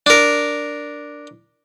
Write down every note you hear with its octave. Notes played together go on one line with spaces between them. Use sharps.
D4 A#4